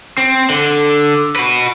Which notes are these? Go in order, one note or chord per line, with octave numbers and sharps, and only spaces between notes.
C4
D3
F#4 B4